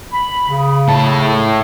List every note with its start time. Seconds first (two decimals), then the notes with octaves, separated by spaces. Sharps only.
0.12 B5
0.49 C#3
0.88 A2 A5